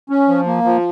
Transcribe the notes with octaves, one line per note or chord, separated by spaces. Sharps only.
C#4
F3
A#3
F3